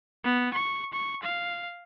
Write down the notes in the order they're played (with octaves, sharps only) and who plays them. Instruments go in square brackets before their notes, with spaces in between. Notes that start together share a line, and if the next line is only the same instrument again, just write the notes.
[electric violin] B3
C#6
C#6
F5